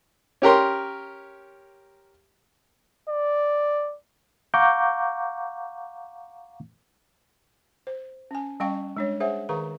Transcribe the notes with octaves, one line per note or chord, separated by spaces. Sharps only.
C#4 G4 A#4 C6
D5
F5 F#5 A#5 C#6 D6 G6
C5
C#4 G#5
G3 C#4 D#5 F5 G5 C#6
G#3 D4 C#5
G#4 C5 C#5 E5 F#5 G#5
D#3 G#4 B4 F5 A#5 C#6